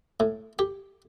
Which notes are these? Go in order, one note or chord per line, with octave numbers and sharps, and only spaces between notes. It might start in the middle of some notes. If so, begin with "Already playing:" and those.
A2
G4